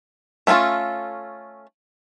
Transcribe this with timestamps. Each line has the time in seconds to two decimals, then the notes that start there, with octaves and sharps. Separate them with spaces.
0.47 A3 C#4 E4 F4 A4